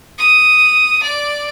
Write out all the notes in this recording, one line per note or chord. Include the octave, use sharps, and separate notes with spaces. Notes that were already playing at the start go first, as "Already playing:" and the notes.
D#6
D5